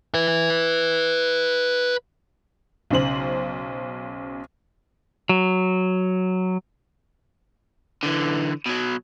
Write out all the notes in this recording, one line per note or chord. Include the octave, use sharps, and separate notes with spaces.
B4 E5
B1 C#3 C5 F#7
F#3
D3 E3
B2 F#3